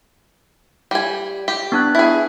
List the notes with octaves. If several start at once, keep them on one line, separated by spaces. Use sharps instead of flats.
G3 G#5
G4
B3 D4 F#6
E4 G#4